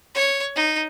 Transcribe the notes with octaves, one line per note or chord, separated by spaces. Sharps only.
C#5
D#4